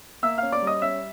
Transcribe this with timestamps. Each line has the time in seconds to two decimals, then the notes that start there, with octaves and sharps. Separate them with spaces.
0.23 A#3 E5 E6
0.38 C#4 F5 F6
0.52 D5 D6
0.62 G3
0.67 D#5 D#6
0.82 C#4 E5 E6